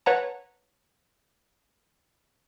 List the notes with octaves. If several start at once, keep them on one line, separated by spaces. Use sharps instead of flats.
B4 C#5 F#5 A5 A#5